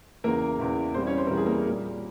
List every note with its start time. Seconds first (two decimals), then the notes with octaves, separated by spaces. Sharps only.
0.24 E2 C#3 E3 A#3 A#4
0.59 E2 C#3 E3
0.94 E2 E3 G3 C4 C5
1.07 C#4 C#5
1.18 C5
1.27 E2 E3 G3 A#4
1.37 G#4
1.46 A#3 A#4
1.66 A#2 G3